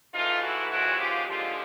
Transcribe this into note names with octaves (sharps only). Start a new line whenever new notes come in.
G#2 E3 A3 D#4 F4
E4 F#4
D#2 C#3 F3 G#3 E4 F#4
F4 G4
D#2 D3 F3 G#3 F4 G4